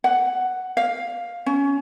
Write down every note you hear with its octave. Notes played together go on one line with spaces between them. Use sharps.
F#5
F5
C#4